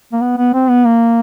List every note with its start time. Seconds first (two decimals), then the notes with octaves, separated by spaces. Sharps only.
0.13 A#3
0.21 B3
0.37 B3
0.54 C4
0.69 B3
0.85 A#3